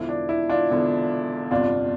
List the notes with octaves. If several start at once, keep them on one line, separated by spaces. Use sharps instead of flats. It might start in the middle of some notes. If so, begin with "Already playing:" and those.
Already playing: E1 E2 D3 F3 E4
D4
E4
D4 F4
E1 E2 D3 F3
G1 F2 C3 D4 F4